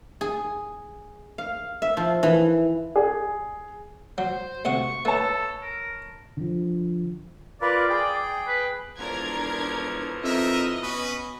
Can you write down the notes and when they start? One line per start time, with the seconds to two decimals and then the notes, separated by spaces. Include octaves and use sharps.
0.21 G#4
1.38 F5
1.82 E5
1.97 F3
2.23 E3
2.96 G#4
4.18 F#3 C5
4.65 D2 C3 F#5 C#6
5.05 A3 A4 B4 C#5 A5
5.62 A#4
6.37 D3 F3
7.61 F4 A#4 B4 D5
7.90 G#4 G5
8.48 B4
8.98 E1 A2 E3 F3 D4 A#4 G#6
10.23 F2 D#4 A#4 D#5 E5
10.82 B2 C#4 F#4 B4